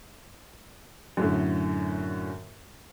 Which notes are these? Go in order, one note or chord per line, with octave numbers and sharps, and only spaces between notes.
F#2 A2 D3